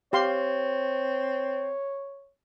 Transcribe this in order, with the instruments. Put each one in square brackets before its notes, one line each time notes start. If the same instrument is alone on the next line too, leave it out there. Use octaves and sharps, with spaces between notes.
[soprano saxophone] C4 [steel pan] G4 F5 C6 [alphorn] C#5